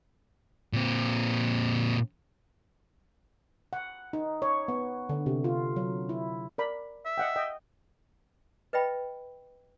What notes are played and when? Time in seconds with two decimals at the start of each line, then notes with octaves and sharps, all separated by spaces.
0.73 A#2 C4
3.73 F#5
4.13 D#4
4.42 C#5
4.68 B3
5.09 D3
5.26 C3
5.44 F4
5.76 F#3
6.09 E4
6.58 A#4 D5 B5
7.05 E5
7.18 D#5 F#5 G5
7.36 D#5 G5
8.73 B4 D#5 E5 G5 B5